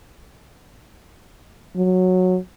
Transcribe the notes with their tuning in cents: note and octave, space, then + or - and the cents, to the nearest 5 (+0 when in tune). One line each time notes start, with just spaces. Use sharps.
F#3 -10